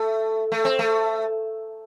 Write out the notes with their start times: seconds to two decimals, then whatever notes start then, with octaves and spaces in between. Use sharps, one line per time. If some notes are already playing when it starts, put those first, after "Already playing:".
Already playing: A3
0.52 A3
0.65 C4
0.79 A3